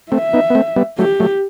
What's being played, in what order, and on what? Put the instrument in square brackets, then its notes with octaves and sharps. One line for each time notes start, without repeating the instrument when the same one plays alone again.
[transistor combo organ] A3 C4 [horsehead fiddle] E5
[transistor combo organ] B3 D#4
B3
A3 C4
G3 B3
[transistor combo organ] F#3 A3 [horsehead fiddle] G4
[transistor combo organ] F#3 A3